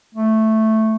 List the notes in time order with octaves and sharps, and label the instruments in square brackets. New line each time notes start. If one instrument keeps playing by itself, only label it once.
[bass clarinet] A3